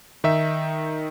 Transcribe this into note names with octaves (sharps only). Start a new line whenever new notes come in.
D#3 D#4 E5